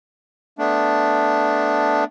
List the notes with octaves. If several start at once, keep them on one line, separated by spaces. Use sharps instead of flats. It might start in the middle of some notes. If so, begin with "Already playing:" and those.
A3 B3 D4